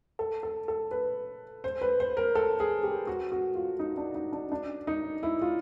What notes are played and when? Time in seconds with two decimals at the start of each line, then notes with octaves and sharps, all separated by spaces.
0.19 A4
0.43 A4
0.68 A4
0.91 B4
1.64 C5
1.81 B4
2.00 C5
2.17 A#4
2.35 A4
2.60 G#4
2.83 G4
3.07 F#4
3.32 F#4
3.55 F4
3.79 D#4
3.97 D4
4.15 D#4
4.32 D4
4.52 D4
4.87 D#4
5.23 E4
5.41 F4